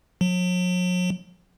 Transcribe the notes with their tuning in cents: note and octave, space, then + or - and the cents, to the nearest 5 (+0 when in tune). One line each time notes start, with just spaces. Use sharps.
F#3 -40